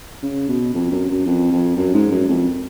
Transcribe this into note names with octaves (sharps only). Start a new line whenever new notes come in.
C#3
B2
F2
F#2
F#2
F2
F2
F#2
G#2
F#2
F2